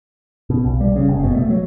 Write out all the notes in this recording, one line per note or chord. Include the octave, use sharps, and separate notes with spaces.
B2
B1
G3
C#3
F#1
B2
A3
F#3